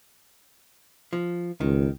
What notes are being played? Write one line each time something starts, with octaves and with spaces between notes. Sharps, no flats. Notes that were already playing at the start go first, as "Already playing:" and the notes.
F3
C#2 D#3